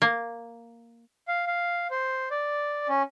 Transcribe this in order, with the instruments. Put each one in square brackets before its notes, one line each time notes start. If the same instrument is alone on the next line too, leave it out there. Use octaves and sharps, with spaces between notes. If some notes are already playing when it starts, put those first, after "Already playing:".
[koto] A#3
[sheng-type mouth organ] F5
F5
C5
D5
C#4